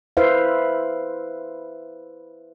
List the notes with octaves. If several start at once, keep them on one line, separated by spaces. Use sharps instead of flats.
E4 B4 C5 E5 F5